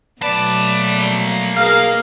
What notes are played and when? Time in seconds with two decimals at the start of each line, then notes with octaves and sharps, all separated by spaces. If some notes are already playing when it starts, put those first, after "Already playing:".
0.21 B2 F#3 A3 A#3 B4 D5 A5
1.56 B2 D#4 G#4 A#4 F5